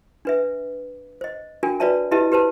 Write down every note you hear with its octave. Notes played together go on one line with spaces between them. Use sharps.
D4 B4 E5
C5 D#5
D4 F#4 A#4 G5 G#5
F#4 B4 C#5 D5 E5 A5
E4 G4 B4 D#5 E5 A5
G4 B4 C5 A5